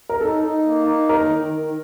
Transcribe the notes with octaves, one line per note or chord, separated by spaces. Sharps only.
A#4
D#4 A4
D#4
A#3
D#4
D#3 A#4
D#3
D#3